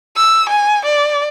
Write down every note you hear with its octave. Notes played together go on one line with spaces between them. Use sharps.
E6
G#5
D5